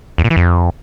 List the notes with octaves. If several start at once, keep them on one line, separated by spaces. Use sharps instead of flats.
E2
A#2
E3
F2